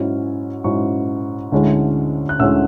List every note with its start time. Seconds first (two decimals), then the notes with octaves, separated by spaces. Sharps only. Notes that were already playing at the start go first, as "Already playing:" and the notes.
Already playing: G#2 F#3 C#4 E4
0.64 G#2 F#3 C#4 E4 C#6
1.52 D2 D3 G#3 C#4 E4
2.29 F#6
2.39 D2 D3 G#3 C#4 E4 E6